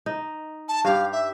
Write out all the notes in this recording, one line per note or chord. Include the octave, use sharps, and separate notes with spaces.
D#4
A5
G2 G4 F5
E5